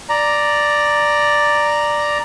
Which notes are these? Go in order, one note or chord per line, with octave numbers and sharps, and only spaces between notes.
D5 A#5